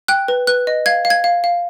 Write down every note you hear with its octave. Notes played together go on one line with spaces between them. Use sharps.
G5 F#6
B4
B4 F#6
D#5
F5 G#6
F5
G#6
F5
F5